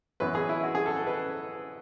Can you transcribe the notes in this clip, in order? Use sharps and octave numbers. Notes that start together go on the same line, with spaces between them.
F#2 E3 B3 B4
G#4
E4
F#4
G#4
A4
A4
B4